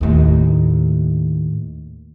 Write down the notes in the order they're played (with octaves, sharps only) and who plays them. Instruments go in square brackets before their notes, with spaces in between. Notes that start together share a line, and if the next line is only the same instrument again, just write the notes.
[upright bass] D#2 A2